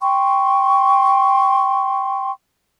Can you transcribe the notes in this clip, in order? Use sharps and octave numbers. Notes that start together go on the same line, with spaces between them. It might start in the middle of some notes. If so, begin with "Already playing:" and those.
G5 C6 C#6